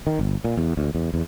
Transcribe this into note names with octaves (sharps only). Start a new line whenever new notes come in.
D#3
G1
A#2
E2
D2
E2
E2